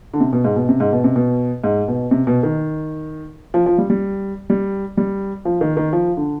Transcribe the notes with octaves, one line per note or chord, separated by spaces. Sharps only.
D3
C3
B2
G#2
B2
C3
G#2
B2
C3
B2
G#2
B2
C3
B2
D#3
F3
F3
G3
G3
G3
G3
F3
D#3
D#3
F3
D3